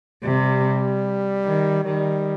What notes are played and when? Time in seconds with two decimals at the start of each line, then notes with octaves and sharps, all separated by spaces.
0.24 C3 G3
1.45 D#3
1.85 D#3 G3